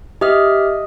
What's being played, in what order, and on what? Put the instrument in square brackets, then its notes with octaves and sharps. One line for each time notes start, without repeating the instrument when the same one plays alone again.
[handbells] G4 E5 F6 [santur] D#5